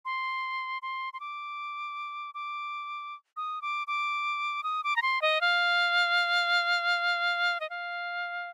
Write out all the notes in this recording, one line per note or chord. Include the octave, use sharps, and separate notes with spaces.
C6
C6
C6
D6
D6
D#6
D6
D6
D#6
D6
A#5
C6
D#5
F5
D#5
F5